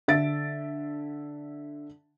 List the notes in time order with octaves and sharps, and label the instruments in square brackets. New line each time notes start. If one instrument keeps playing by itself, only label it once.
[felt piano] D3 E5 A6 D7